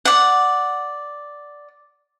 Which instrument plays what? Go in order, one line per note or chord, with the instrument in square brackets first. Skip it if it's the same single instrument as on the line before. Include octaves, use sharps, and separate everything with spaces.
[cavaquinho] D5 F#5